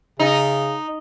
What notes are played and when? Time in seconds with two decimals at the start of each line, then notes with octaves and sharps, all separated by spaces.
0.19 C#3 D#4